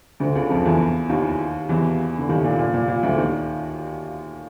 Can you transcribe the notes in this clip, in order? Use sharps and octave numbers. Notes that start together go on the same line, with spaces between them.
D2 D3
C#2 C#3
F2 F3
E2 E3
D#2 D#3
E2 E3
D3
D#2 D#3
A#2
A#2
A#2
A#2
D2 D3
D#2 D#3